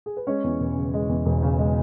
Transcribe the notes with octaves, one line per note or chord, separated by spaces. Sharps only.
G#4
B4
G#3 C#4 C#5
E2
E1
C#3
G#3
E2
E1
C#3
G#3